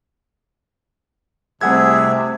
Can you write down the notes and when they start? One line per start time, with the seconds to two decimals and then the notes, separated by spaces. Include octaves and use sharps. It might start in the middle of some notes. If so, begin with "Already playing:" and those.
1.61 C2 C3 A3 C4 G#4 E5 F#5 G#6